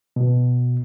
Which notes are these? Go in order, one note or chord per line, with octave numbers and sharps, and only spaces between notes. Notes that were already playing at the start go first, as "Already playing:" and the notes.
B2